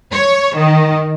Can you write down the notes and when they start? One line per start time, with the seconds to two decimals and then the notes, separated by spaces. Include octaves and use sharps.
0.11 C#5
0.55 D#3